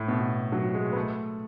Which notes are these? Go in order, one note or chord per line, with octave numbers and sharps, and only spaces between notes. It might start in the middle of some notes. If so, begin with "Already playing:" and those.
Already playing: A2
B2
F#3
G#3
B3
A3